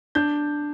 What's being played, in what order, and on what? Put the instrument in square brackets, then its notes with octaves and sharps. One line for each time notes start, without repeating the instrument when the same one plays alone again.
[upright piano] D4 G6